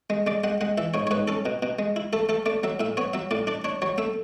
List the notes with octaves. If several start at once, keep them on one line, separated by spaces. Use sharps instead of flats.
G#3
G#3 D5
G#3 F#5
G#3 F#5
E3 E5
G#2 C#5
C#5
G#2 B4
C#4 A4
B2
B2
G#3
E4
A3 A4
A3 A4
A3 D5
F#3 E5
A2 E5
B3 C#5
F#3 E5
A2 D5
D4 D5
D4 C#5
F#3 C#5
A3 E5